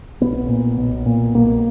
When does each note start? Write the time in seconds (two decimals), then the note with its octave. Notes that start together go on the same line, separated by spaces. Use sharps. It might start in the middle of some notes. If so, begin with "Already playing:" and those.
0.21 B1 B3
0.49 A#2
0.77 B1
1.06 A#2
1.34 B1 A#3